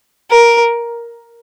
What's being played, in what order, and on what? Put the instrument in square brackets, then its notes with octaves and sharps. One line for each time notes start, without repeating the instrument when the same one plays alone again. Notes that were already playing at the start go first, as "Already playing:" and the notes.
[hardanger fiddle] A#4